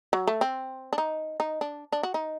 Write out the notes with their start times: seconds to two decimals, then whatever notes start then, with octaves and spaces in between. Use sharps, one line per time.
0.13 F#3
0.27 A3
0.41 C4
0.93 D4
0.98 D#4
1.40 D#4
1.61 D4
1.92 D4
2.03 F#4
2.14 D#4